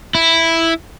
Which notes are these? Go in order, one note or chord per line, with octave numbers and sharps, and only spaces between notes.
E4